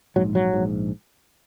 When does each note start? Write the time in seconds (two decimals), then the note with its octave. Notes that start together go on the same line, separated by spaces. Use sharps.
0.16 A#1 G#2 F#3
0.35 F#3
0.53 A#1 G#2